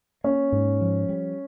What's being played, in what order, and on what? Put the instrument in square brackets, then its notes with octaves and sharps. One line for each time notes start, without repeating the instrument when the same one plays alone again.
[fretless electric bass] A#3 [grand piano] C#4
[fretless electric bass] G#2
F3
G3